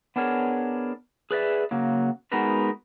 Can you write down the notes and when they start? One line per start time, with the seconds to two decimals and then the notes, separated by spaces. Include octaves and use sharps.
0.16 B3 D4 G#4 A#4 C#5
1.31 G#4 B4 D5 E5
1.71 C#3 F#3 A#3
2.32 G#3 B3 D#4 F#4 A#4 B4